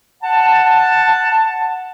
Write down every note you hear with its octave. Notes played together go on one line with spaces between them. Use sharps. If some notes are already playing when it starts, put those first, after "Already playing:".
F#5 A5